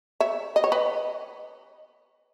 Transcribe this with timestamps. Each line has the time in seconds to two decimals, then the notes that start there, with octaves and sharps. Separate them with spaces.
0.20 C#5 E5
0.56 D#5
0.64 C#5
0.72 B4 D#5